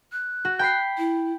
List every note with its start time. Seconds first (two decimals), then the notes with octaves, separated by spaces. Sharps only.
0.12 F#6
0.45 F#4
0.59 G5 B5 C7
0.98 E4